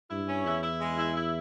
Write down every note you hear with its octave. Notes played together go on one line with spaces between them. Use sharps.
G2 E4
C#4
E2 E4
E4
G#3
E4
E4